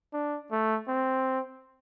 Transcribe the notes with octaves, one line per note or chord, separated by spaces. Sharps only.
D4
A3
C4